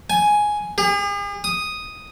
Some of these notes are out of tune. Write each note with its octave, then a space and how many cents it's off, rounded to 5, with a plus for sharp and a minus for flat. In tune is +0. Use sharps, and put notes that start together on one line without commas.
G#5 +5
G#4 -45
D#6 +0